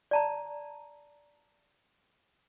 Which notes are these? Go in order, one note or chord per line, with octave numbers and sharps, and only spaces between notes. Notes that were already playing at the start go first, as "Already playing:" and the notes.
D5 A5 A#5